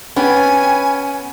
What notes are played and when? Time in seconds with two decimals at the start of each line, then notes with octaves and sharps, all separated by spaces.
0.16 B3 C#4 G5 G#5